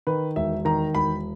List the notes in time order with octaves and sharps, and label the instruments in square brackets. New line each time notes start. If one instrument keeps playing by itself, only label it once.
[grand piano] D#3 B4
E1 E5
D#3 A#5
E1 B5